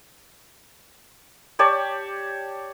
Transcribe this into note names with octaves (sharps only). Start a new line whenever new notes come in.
G4 C#5 D5 A5